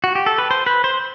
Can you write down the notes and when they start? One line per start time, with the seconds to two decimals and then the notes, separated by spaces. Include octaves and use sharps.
0.04 F#4
0.15 G4
0.26 A4
0.38 B4
0.51 C5
0.66 B4
0.84 C5